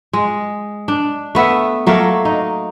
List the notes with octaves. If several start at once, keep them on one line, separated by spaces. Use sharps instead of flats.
G#3
D4
A3 B3 E5
F#3 A3 A#3 F5
D#4